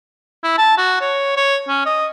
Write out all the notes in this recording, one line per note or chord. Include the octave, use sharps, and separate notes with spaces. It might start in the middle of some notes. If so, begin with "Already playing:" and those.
E4
A5
F#4
C#5
C#5
C#4
D#5